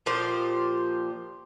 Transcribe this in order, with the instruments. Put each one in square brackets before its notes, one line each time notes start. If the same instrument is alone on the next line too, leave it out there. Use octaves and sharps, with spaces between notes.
[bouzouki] A#2 F3 G4 C5